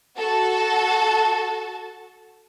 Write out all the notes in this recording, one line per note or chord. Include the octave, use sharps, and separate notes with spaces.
F#4 A4 A5